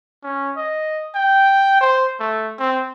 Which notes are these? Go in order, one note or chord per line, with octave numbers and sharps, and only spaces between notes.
C#4
D#5
G5
C5
A3
C4